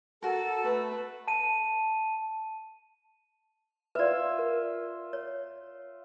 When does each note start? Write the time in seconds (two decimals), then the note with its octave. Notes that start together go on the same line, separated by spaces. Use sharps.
0.23 F#4 A4 A#4 A5
0.63 A3 B4
1.28 A5 D#7
3.95 F4 B4 D5 E5
4.39 A#4
5.13 C#5